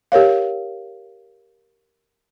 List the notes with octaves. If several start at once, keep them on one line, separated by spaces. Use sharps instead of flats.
G4 A#4 C#5 F5